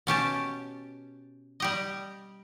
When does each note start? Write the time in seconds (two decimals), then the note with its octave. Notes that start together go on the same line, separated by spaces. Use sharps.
0.07 B2 C#4 G4 A5
1.60 G3 G4 D#5